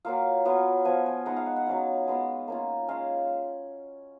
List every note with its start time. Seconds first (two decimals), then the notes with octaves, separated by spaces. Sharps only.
0.05 F#3 A#3 F4 F5
0.45 F#3 B3 F4
0.85 F3 B3 F4 G#5
1.06 G#5
1.26 G#3 B3 D#4 F#5
1.36 F5
1.46 F#5
1.56 F#5
1.66 F#3 C#4 F4 F5
2.08 G#3 B3 F4
2.48 A#3 C#4 F4
2.88 G#3 C#4 F4 F5